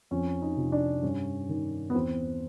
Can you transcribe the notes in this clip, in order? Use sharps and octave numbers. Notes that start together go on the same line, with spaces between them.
F2 C#4
D#4
C3 F3
D4
G2 C#4
D#3
B3
E2 C4